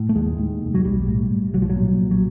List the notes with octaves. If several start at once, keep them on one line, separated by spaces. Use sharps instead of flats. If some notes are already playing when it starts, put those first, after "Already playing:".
Already playing: A2
A3
D#2 G#3
D#2
F1
F#3
B1 G3
A2
A2
B1 F#3
F3
F#3
A#2
B1
F#3